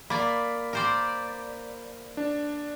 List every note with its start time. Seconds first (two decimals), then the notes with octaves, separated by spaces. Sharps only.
0.10 A#3 D5 B5
0.73 A#4 C5 D5
2.17 D4